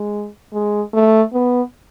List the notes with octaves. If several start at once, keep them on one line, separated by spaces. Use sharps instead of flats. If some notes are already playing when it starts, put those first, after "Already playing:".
Already playing: G#3
G#3
A3
B3